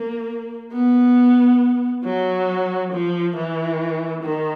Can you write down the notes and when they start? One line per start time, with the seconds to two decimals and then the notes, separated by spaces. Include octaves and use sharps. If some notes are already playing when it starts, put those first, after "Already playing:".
Already playing: A#3
0.73 B3
2.05 F#3
2.92 F3
3.36 E3
4.23 D#3